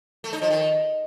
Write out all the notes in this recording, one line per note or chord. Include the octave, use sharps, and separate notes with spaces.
A3
D#4
F3
D#3